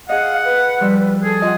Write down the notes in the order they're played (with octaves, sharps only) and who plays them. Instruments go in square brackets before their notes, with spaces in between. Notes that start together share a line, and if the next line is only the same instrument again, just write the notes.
[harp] G#4 D#5 [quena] F5 [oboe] F#5
[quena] B4
[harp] F3 G3 E6
[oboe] G#4 [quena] A4
[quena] F4 [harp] D#5 F#5